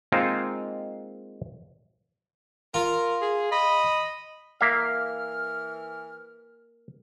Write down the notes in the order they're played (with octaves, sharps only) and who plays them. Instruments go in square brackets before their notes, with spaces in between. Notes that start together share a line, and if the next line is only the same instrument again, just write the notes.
[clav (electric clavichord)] G#3 A#3 C4 D#4 F4 C5
[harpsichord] F4 [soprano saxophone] A#4
[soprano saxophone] G#4
[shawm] D#5 [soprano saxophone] B5
[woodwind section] E3 F6 [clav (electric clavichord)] A#3 E5 F5